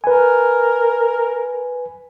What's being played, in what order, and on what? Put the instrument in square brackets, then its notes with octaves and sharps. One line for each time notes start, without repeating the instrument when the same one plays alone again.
[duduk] A#4 [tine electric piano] B4 G#5